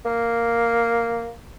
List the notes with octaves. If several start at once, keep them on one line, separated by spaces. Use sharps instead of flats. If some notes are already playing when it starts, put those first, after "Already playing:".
A#3